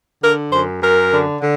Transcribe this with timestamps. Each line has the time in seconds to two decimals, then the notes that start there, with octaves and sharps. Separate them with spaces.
0.22 D3 A#4
0.52 F#2 C5
0.82 F#2 A#4
1.12 D3
1.41 D3